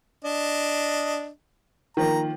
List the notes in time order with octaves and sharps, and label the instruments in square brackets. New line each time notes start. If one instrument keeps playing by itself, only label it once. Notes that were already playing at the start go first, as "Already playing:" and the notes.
[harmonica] D4 D#5
[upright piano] D#3 F3 A#3 [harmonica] A#5